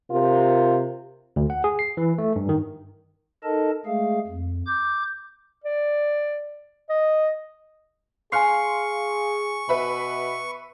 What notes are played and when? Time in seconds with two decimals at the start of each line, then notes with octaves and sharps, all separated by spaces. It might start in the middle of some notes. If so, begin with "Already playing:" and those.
0.11 C3 F4 A#4
1.36 D2
1.50 F#5
1.64 G#4
1.79 C7
1.97 E3
2.18 A3
2.36 G2
2.49 D#3
3.44 D#4 A4 A#4 D#5 A5
3.86 G#3 A3 G#4 F5
4.27 F2
4.67 D6 G6
5.64 D5
6.90 D#5
8.32 G#4 F5 G#5 C6 C#6 F6 C7
9.69 B2 B4 E5 B5